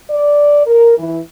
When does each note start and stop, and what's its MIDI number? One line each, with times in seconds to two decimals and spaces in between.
0.10 0.65 74
0.66 0.95 70
0.98 1.19 52